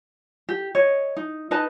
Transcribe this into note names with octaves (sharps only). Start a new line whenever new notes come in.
G4
C#5 D#5
D#4
D#4 B4 D#5 A5